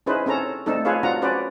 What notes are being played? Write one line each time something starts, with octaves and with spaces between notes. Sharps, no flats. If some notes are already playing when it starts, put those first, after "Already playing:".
C#4 D#4 E4 G#4 B4 C5
C4 C#4 A4 A#5
A3 C4 D4 D#4 A4
F4 G#4 B4 C#5 F5
C4 D4 F4 F#4 F#5 A#5
C#4 F#4 B4 C5 D5